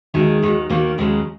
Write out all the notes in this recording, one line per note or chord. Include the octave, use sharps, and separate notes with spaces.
D#2 D#3 F#3 G#3
D#2 D#3 F#3
D#2 D#3 F#3 A#3
D#2 C#3 F#3 G#3